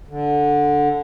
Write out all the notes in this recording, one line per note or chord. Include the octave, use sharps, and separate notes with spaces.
D3